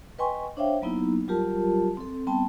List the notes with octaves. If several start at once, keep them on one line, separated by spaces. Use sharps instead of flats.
B4 D#5 G5 G#5 C6 C#6
D4 C5 C#5 E5 F5 G5
F#3 A#3 B3 D#4 E4
F#3 G3 F4 G4 A#4 A5
C4 A4
G3 B3 C4 G5 A5